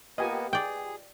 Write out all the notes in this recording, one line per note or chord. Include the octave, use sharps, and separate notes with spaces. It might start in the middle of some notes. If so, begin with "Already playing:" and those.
A#3 B3 F4 G4 B4 D#5 G#5
G#4 D5 G5